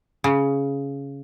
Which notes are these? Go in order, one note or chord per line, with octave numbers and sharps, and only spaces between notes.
C#3